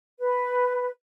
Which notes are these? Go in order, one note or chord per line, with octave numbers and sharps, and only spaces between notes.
B4